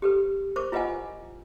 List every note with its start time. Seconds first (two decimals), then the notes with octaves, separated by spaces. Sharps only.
0.02 G4 A4 B4
0.56 A#4 C5 C#6 D6
0.72 E4 F4 B4 D#5 F#5 G#5